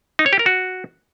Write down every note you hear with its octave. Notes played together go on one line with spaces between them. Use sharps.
D#4
C#5
G4
A#4
F#4